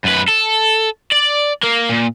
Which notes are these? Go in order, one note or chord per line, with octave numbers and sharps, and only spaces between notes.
F#2 B4
A4
D5
A#3
A#2